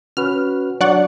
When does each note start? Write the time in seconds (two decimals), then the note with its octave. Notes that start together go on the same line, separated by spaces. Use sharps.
0.17 C#4 F#4 B4 F6
0.81 F#3 D4 D5 F#5 C#6